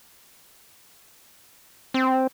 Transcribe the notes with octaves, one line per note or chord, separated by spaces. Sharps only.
C4